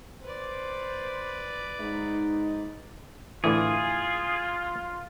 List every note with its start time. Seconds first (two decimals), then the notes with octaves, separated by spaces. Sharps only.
0.23 B4 C5 D5
1.80 G#2 D#4
3.44 A2 D3 E3 F4 G#4